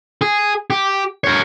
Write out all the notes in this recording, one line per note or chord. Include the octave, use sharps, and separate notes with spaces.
G#4
G4
A#4 C#5